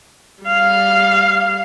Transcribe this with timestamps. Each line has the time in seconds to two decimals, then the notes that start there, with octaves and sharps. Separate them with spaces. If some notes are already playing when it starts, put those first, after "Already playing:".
0.44 G3 F5